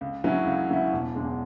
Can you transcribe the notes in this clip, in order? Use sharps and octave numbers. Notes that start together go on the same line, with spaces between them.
C#2
C#3 F#3 C#4 E4
C#2
C#3 F#3 C#4 E4
E1
E2 C#3 G#3